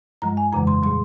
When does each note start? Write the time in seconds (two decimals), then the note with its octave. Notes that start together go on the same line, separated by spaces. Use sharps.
0.22 G2 F3 G#3 A#5
0.37 G#5
0.52 F2 C#3 E3 G#3 A#5
0.67 C6
0.83 A#2 G3 C6